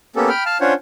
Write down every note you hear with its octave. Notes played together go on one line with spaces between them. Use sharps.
A#3 B3 C#4 G4 A4
G5 B5 F6
F5 A5 F6
C#4 D4 F4 C5 C#5 F#5